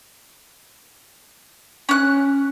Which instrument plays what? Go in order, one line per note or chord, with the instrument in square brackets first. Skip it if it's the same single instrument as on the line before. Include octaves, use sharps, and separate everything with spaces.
[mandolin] C#4 F#6